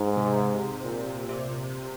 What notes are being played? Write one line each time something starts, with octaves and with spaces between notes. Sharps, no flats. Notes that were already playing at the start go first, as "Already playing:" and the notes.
Already playing: G#2
C3
A#2
C3